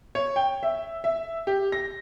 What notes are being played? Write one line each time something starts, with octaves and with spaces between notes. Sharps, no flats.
C#5
G5
E5
E5
G4
A#6